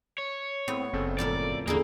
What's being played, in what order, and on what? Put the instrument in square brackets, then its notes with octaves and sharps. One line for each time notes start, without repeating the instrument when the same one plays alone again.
[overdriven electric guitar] C#5
[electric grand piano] A2 [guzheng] B3 [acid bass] C4
[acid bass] F#1 [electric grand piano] C#3 C4 A4
[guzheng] F2 A2 A#3 [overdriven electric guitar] D5
[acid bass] E2 [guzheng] D3 E4 G#4 [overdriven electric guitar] A#3